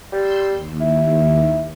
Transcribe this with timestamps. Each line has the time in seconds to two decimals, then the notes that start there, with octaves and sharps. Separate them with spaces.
0.12 G3 C6 E6 G6
0.45 D#2
0.81 E4